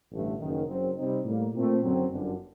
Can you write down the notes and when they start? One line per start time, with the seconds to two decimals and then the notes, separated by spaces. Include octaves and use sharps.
0.11 A1 G2 D3 A3
0.39 F#1 F#2 D#3
0.68 F#1 F#2 F#3 C4
0.97 C3 G3 C4 D#4
1.25 A2 G3 A#3
1.54 A#2 A3 C4
1.82 F#1 F#2 D3 F#3 C4
2.11 G1 F#2 D3